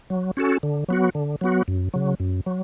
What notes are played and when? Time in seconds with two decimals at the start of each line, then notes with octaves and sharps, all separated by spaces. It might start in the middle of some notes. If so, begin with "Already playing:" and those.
0.10 F#3
0.37 C#4 F#4 A4
0.63 D3
0.89 F#3 B3 F#4
1.15 D3
1.41 F#3 B3 F#4
1.68 F#2
1.94 C#3 F#3
2.20 F#2
2.46 F#3